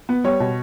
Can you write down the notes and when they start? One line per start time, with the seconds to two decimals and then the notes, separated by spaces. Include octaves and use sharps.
0.09 B3
0.24 G3 C#5
0.40 B2